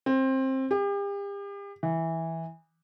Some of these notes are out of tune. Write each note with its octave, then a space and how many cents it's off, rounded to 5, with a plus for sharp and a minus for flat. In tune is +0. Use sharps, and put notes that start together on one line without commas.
C4 +20
G4 +40
E3 -10